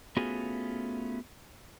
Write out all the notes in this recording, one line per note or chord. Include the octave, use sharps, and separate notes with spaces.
A3 B3 C#4 F4 F#4 G#4